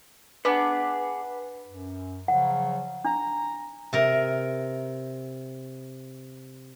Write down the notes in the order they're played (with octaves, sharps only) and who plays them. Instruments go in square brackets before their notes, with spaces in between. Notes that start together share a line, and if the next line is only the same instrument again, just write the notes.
[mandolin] D4 G#4 [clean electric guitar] B4 F#5
[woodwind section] F#2
[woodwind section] C#3 F3 F#3 [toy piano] F#5
[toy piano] D4 [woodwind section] A#5
[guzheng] C3 A#4